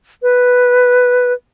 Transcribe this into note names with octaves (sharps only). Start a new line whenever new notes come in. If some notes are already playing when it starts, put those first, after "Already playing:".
B4